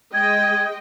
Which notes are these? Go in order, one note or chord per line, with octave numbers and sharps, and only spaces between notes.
G#3 D#5 G5 G#6